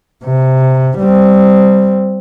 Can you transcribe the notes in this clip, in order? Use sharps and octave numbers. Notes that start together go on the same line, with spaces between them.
C3
G3 C4